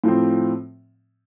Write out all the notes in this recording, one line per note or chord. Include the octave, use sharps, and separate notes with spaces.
A2 F3 C4